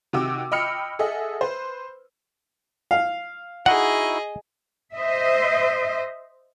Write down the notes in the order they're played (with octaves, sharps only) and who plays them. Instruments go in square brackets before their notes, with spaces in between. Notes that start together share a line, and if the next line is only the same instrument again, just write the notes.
[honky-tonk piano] C3 D#3 F#4 G5 D6 E6
D#5 G5 B5 E6 F6 C#7
G#4 A4 D#5 E5 F#5
B4 C5
[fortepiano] F5
[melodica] D#4 E4 F#4 [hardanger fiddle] G#4 D#5 [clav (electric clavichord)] F#5
[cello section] C5 D#5 E5